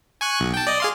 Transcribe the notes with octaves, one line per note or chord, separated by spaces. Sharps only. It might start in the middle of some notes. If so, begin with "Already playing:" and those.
G#5 C#6 F#6
B1
G5 A5
D5 D#5
G#4 F5 C6